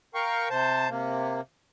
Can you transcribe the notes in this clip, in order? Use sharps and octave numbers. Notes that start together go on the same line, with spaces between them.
A#4 F5 G5 C#6
C3 C5 A5 G6
C3 A#3